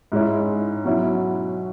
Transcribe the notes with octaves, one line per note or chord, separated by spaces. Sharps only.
G#2 G#3 C#4 E4
B2 F#3 C#4 E4